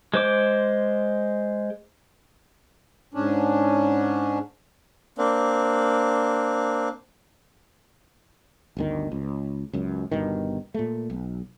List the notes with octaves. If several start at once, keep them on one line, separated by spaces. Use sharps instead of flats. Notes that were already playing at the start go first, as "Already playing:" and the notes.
G#3 C5 D6
G#2 C#4 D4
A#3 C4 D4
G1 D2 D#3
C#2
C#2 F#2
G1 G2 B2 D#3
A#2 A3
B1